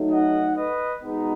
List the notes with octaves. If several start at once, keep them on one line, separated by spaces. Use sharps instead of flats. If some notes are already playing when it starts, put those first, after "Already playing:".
Already playing: F#3 A3 D#4
D#5 F#5
B4 D#5
B2 G#3 B3 D#4